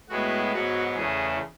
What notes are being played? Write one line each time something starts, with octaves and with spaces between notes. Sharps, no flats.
A2 G#3 B3 F#4
G#2 F#3 B3 F#4
E2 C#3 E3 A3 G#4